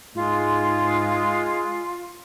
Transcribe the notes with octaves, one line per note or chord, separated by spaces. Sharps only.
G#2 G#3 F4